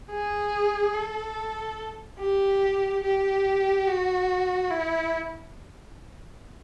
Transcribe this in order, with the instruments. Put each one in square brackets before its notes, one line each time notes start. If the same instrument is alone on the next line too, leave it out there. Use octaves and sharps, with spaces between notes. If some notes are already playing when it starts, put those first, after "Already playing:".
[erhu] G#4
A4
G4
G4
F#4
E4